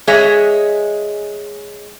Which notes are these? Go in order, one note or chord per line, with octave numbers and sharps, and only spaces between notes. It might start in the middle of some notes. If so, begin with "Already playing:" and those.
G#3 G#4 C#5 D#5 E5